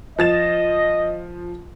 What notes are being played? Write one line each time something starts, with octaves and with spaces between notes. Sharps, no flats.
F3 D#5 A6 E7